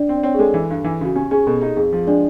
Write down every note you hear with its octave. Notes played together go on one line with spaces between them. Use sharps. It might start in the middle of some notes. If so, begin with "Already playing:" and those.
Already playing: D4 D5
C4
D5
C4 C#5
G#4
G#3 A4
E3
G2
E3
C#3 F#4
C#4 G4
C#4 G#4
B2 A4
D#4 G4
F2 G#4
F3
G#3 D4 D5